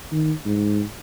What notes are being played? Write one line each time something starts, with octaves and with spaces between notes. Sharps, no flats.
D#3
G#2